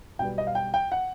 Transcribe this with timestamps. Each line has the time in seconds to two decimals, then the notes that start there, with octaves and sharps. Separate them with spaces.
0.19 B1 B2 G3 B3 G5
0.38 D#5
0.47 F5
0.55 G5
0.74 G5
0.92 F#5